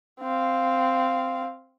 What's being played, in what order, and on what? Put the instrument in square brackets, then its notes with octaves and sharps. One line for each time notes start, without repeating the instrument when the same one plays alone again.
[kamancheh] C4 F5